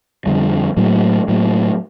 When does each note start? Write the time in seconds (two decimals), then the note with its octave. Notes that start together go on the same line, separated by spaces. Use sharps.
0.26 F2 D3 G3
0.77 A2 F#3 A#3
1.28 A2 F#3 A#3